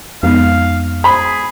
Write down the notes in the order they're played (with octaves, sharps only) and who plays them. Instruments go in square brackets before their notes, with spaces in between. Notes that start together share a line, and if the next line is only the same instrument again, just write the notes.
[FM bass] F2 [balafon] G#3 B3 D#4 [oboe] F5
[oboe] G#4 [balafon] C5 [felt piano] B5